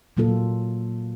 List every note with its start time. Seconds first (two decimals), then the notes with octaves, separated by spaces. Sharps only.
0.17 A#2 F#3 A#3 F4 A4